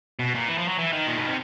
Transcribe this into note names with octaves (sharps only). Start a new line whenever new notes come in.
B2
A#2
E3
F3
F#3
E3
D#3
A#2
B2
C3